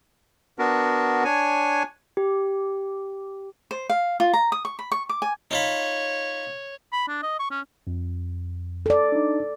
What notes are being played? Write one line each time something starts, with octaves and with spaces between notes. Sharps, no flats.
B3 D4 F#4 A#4
D4 C#5 G#5
G4
C5
F5
F4
A#5
D#6
C#6
B5
C#6
D6
G#5
D#4 F4 C#5 B5
B5
D4
D#5
C#6
C#4
F2
A4 D5
D4 D#4